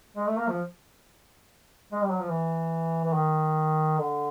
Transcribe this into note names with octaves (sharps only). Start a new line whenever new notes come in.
G#3
A3
A#3
F3
G#3
G3
F#3
F3
E3
E3
D#3
D3